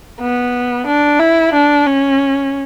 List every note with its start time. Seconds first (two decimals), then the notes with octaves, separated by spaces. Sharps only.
0.21 B3
0.87 D4
1.19 E4
1.53 D4
1.86 C#4